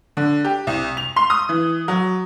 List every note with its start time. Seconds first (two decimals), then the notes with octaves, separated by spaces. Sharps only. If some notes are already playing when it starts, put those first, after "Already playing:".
0.17 D3
0.45 G4
0.67 C2
0.97 F7
1.16 C6
1.30 D#6
1.49 E3
1.88 F#3